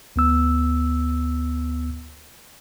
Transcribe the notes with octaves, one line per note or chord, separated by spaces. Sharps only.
D2 B3 E6